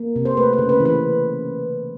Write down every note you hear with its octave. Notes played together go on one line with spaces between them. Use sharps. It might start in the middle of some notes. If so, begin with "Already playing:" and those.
Already playing: A#3
C3
C5
A3 B4
B4
C#3
B4
E3
B4